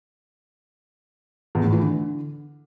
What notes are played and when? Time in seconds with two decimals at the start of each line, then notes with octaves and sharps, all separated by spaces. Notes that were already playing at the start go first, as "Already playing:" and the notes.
1.55 E2
1.64 A2
1.73 E3
1.81 D3